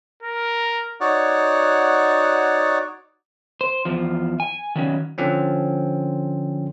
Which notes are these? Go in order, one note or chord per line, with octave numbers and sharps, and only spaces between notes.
A#4
D#4 F#4 C#5 D5 F#5
C5
E2 F3
G#5
D#3 F#3 C#4
D3 F3 C4 C#4